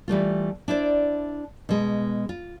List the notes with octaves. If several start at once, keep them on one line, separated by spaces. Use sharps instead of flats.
E3 G3 A3 F4
D4 E4 C5 D5
B2 G#3
F4